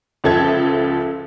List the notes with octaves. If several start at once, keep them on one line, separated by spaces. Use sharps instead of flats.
C#2 F3 A4 E5 G#6